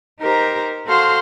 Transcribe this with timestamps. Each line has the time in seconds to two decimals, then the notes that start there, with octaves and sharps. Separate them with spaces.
0.19 D#4 G4 A#4 C5 A#5
0.85 F#4 A4 C5 F5 C6 F6